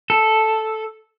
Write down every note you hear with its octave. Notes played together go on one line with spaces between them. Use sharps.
A4